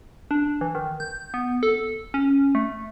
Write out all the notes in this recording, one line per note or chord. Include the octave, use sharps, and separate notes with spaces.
D4
E3
D#3
G6
B3
A4
C#4
A3